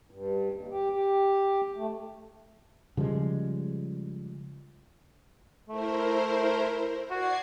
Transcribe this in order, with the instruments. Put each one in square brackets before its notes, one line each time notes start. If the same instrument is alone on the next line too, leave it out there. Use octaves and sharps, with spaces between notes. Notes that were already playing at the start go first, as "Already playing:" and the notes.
[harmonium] G2
D#2
G4
G4
A3
[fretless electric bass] C#3 F3 G3 G#3
[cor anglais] A3 [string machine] E4 A#4 C5
[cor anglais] F#4 [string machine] D5 G#6 C7